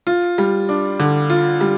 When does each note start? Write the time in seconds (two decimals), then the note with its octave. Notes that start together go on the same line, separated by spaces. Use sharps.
0.07 F4
0.38 G3
0.69 D4
1.00 D3
1.30 F4
1.61 G3